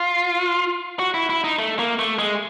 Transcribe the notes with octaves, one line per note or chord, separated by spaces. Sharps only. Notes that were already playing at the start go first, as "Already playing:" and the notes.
Already playing: F4
F#4
E4
E4
D#4
A3
A#3
A3
G#3